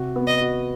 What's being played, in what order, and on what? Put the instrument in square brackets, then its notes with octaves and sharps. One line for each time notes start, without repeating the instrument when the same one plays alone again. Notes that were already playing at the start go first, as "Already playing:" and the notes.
Already playing: [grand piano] C3 F#4
B3
[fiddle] D#5
[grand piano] F#4